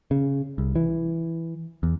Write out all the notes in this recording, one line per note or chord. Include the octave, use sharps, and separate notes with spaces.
C#3
C2
E3
E2